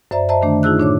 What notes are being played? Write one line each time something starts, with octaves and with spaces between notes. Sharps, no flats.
F#2 C5 D5 E5 A#5
C5 D#5 E5 A5 A#5
D3 D#3 A3 D4
D#4 F4 G#4 E6 F#6
A2 D4 C#5 D6